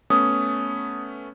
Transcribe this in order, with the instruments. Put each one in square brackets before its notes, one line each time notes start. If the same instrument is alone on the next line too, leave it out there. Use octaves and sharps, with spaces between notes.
[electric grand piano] A3 B3 C#4 [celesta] D#6